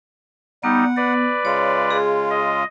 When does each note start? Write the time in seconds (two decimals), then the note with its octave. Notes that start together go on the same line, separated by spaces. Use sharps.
0.64 G3 B3 D#4 F#5
0.97 B4 D5
1.45 C#3 G#3 F4 C#5
1.91 G#4
2.31 D#5